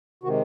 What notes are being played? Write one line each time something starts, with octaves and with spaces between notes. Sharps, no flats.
C3 D#3 G#3 F#4